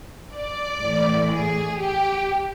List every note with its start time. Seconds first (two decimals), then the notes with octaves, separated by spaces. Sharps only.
0.33 D5
0.83 A2 E3
1.32 G#4
1.81 G4